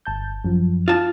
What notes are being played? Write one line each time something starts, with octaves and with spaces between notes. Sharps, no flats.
G1 A5 G6
F#2 F3
F4 A5